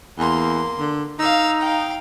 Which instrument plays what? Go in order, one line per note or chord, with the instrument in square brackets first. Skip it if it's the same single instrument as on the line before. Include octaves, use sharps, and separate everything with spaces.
[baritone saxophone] E2 [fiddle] A#3 C6
[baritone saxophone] D3
[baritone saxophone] D#4 [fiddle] F5 E6
[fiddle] F5 G5